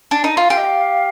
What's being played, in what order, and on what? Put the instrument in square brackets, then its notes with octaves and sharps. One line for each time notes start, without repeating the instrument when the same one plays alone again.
[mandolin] D4
D#4
F4
[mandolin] G4 [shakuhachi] F5
[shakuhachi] D#5
F5